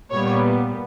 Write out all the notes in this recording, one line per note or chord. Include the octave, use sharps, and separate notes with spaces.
A#2 G3 B3 C#5